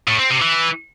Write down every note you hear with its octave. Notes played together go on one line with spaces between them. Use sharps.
A2
C4
C3
E3